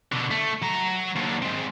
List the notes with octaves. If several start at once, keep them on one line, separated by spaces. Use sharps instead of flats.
B2 D3
A3
F#3 A#5
D#2 D3
G#3 C4